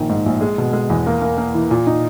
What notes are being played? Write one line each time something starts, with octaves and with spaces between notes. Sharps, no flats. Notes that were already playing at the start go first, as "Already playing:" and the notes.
Already playing: A#1 D#3
G#2
A#1
G#3
B2
G#3
E2
A#3
A#3
A#3
E3
A#2
D#4